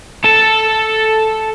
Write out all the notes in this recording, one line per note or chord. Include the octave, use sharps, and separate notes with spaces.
A4 A5